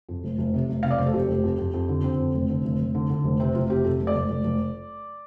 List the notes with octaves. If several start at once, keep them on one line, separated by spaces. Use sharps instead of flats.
F2
F1
F1
C3
F1
C3 F5
D5
F1 C5
A4
F2 G4
F1
F2
F2
F2
D3
D3 C4
F2
F1
D3
F1
F1
D3
D3
F1
C3 C4
F1 F4
C3 G4
F2 A4
F1
D5
F1
F1
F1